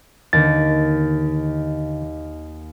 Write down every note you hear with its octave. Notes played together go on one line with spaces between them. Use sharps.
D#2 D3 A6